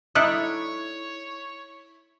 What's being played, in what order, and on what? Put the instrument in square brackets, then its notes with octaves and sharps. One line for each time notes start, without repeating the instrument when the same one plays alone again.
[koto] D#4 A4 D5 [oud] E4 [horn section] C#5 [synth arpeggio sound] D#6 F#6